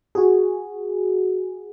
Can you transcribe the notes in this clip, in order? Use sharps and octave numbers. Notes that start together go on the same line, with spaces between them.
F#4 G#4